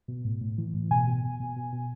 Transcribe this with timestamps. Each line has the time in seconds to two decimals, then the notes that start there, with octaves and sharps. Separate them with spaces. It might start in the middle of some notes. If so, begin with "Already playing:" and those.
0.08 B2
0.25 A2
0.41 A2
0.58 E3
0.74 A2
0.91 B2 G#5
1.07 B2
1.24 B2
1.40 B2
1.56 B2
1.73 B2